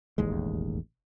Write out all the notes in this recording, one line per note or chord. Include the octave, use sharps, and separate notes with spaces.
E1 A1 D#2 G#3